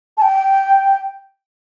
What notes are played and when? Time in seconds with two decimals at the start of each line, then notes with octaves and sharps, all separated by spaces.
0.18 A5
0.22 G5